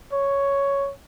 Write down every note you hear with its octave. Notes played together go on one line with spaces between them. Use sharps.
C#5